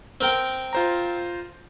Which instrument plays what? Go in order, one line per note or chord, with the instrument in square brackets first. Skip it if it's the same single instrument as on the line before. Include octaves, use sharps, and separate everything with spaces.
[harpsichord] C4 A#4 G5
[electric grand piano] F4 C5 A#5